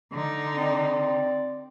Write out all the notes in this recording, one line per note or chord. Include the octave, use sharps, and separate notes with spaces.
D3 D#4
C4 D5